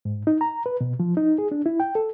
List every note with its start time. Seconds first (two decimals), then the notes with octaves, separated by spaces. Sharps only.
0.05 G#2
0.27 D#4
0.41 A#5
0.66 B4
0.81 B2
1.00 F3
1.17 D#4
1.38 G#4
1.52 D4
1.66 E4
1.80 G5
1.95 A4